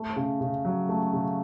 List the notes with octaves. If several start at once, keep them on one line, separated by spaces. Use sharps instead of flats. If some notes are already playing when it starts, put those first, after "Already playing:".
Already playing: A3
C#3
C#3
F#3
A3
C#3